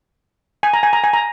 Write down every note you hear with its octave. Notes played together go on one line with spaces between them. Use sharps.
G#5
A#5
G#5
A#5
G#5
A#5